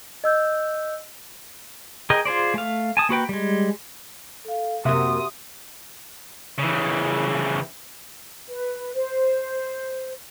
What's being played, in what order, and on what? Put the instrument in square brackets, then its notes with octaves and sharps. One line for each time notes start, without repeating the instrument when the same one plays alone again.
[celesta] D#5 E6 G6
[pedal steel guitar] G#4 A#4 D#5 G5
F4 G#4 C5 D5
A3 F5
G#5 A5 D#6
A#3 F#4 B4 G5
G3 G#3
[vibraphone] A4 F5
[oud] F#2 A#3 [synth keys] C3 F#4 E5 [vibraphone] G4 C6 [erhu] D#6
[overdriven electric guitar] C#3 E3
[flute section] B4
C5